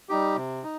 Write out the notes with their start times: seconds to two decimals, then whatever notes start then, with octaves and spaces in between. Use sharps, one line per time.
0.09 G3 D#4 G4
0.36 C3
0.64 D#4